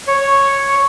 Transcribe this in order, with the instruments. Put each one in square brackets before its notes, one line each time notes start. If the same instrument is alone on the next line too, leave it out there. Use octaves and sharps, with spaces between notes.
[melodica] C#5